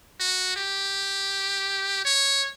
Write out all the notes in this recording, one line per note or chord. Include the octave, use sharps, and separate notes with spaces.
F#4
G4
C#5